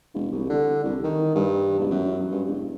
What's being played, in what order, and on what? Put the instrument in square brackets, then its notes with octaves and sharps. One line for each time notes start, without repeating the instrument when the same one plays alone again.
[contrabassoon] E1
C2
D3
C2
D#3
G2
E1
F#2
G2
E1